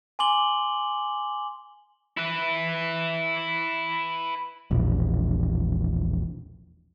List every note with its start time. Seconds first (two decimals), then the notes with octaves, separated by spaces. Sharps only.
0.19 G#5 C6 D6 F#7 G7
2.17 E4 B4
4.71 E1 A#1